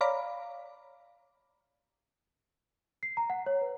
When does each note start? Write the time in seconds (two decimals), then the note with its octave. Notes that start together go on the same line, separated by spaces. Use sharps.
0.01 C#5 D5 F5 A#5 B5 D6
3.03 C7
3.17 A#5
3.30 F#5
3.46 C#5
3.61 B4